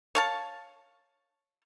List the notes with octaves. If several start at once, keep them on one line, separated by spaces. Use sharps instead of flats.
C#5 F5 A5